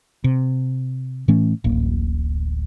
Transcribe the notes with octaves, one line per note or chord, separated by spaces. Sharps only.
C3
A2 E3 A3 C#4
D1 A1 A#3